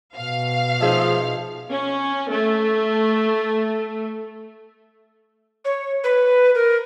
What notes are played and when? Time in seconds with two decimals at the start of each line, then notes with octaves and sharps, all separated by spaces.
0.16 B2 F5
0.81 F3 D#4 G#4 E5
1.70 C#4
2.30 A3
5.64 C#5
6.03 B4
6.54 A#4